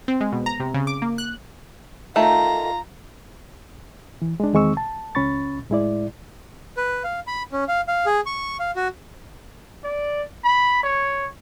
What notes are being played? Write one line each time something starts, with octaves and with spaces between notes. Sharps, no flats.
C4
G#3
B2
A#5
C3
C#3
D6
A#3
F#6
D#3 A3 F4 A#5
E3
G#3 D4
E2 D#3 G#3 C4 C#6 E6
A5
C#2 C#4 B5 C#6 A6
A2 G#3 E4 D5
B4
F5
B5
C#4
F5
F5
G#4
C#6
F5
F#4
D5
B5
C#5